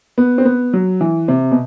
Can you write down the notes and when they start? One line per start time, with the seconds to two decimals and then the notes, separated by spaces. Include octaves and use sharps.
0.18 B3
0.38 C4
0.45 B3
0.73 F#3
1.01 E3
1.28 C3
1.51 B2